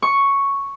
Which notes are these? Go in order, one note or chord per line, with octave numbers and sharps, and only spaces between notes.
C#6